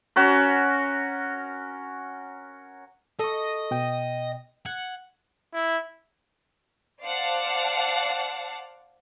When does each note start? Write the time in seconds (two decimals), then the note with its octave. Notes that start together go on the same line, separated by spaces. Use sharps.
0.16 C#4 F#4 A#4
3.20 A4 D#5 C#6
3.71 B2 G5
4.66 F#5 G#6
5.54 E4
7.02 C5 D5 F5 F#5 A5